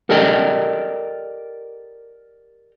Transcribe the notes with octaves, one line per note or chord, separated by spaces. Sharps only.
G4 A4 A#4 D5 D#5 G5